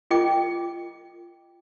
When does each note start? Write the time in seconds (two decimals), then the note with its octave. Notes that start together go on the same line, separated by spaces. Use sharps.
0.11 F4 D#5 G5 D6